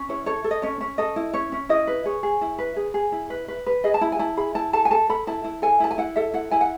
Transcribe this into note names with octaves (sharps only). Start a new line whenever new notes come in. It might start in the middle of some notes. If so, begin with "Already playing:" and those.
Already playing: C#4
E4 C#5
A4 C#5
A4
D#5
C#4 C#5
C#4
A4 D#5
E4
C#4 C#5
C#4
E4 D#5
B4
G#4 C#5
G#4
E4
B4
G#4
G#4
E4
B4
B4
B4
G#4 D#5
A5
E4 B5
G#5
E4 A5
G#4 B5
E4 A5
A4 A5
G#5
A4 A5
A4 B5
E4 A5
E4
A4 G#5
E4 A5
G#5
E4 F#5
A4 E5
E4 F#5
E4 G#5
F#5